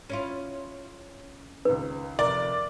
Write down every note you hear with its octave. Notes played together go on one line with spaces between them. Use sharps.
C#4 E4 F4
C#2 D#3 B4
F1 A#4 D5